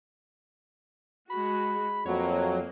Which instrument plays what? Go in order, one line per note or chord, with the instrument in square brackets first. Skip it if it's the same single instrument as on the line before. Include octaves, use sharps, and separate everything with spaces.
[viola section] G#3 F#4 [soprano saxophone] B5
[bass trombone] F2 [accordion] F#3 [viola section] A#3 [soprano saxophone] C#5